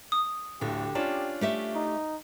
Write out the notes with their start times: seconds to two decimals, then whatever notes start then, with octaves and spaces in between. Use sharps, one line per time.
0.12 D#6
0.61 D1 D3 A3 G4
0.95 C#4 D4 F4 A5
1.41 A3 G4 E5
1.75 D#4